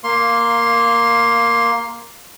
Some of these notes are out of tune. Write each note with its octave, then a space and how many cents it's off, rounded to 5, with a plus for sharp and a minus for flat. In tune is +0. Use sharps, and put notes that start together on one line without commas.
A#3 +0 F5 -10 C6 +15